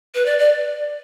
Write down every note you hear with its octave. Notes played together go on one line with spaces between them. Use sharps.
B4
D5
D5